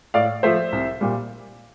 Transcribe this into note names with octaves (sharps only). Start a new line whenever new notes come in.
A2 D5 F5
F3 A3 C5 E5
C2
A#2 G3